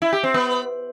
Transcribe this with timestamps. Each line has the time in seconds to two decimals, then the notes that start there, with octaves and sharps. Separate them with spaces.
0.02 E4
0.13 G4
0.23 C4
0.34 B3